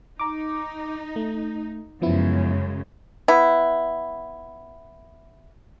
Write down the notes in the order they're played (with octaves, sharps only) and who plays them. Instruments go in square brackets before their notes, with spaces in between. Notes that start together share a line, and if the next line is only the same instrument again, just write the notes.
[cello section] D#4 [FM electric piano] A#5 D6
[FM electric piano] A3
[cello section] F#2 C#3 G#3 [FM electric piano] F3 B3 E4
[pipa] B3 E4